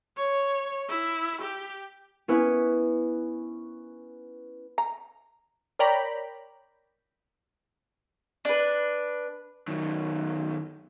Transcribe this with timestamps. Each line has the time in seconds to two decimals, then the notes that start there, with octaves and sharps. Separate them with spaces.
0.17 C#5
0.88 E4
1.42 G4
2.28 B3 C#4 E4 B4
4.78 A#5
5.79 A#4 C#5 D5 G5 A#5 B5
8.45 D4 B4
9.68 F#2 D#3